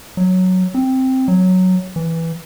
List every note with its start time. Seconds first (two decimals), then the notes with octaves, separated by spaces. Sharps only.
0.17 F#3
0.74 C4
1.28 F#3
1.96 E3